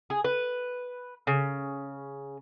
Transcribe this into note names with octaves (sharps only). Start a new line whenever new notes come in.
G#4
B4
C#3